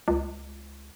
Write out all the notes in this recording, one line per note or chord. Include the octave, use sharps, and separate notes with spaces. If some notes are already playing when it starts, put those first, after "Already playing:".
C#2